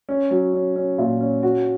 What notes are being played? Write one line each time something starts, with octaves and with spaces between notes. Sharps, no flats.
C#4
F#3
C#4
C#4
A#2
C#4
F#4